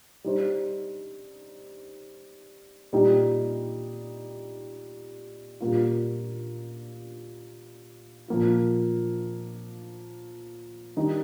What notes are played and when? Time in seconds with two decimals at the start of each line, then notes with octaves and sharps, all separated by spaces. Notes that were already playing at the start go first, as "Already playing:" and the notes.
0.24 G3 D#4 C5
2.92 A#2 G3 D#4 G4
5.60 A#2 G3 A#3 F4
8.28 A#2 F3 A#3 F4
10.97 D#3 G3 D#4